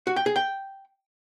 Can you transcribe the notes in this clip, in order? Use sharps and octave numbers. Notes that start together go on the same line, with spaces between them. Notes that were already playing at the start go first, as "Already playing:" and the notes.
F#4
G5
G#4
G5